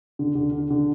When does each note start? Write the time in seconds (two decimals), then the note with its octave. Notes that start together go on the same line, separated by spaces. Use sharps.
0.19 D3
0.35 D3
0.52 D3
0.70 D3